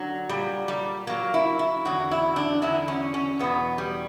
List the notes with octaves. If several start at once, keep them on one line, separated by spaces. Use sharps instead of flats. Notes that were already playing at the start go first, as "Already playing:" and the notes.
Already playing: D3 F#3
A#2 F#3 G3
G3
A#2 F#3 A#3
E4
E4
E2 D3 F#3 F#4
E4
D4
E2 D3 F#3 E4
C#4
C#4
E2 B2 F#3 B3
G3